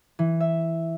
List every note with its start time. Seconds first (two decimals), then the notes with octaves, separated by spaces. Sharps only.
0.19 E3
0.40 E5